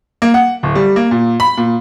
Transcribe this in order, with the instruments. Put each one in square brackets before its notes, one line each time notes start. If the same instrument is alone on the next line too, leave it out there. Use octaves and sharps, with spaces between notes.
[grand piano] A#3
F#5
D1
G3
A#3
A#2
B5
A#2